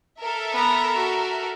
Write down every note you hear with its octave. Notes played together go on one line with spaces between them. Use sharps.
A4 A#4 E5
B3 A#5
F#4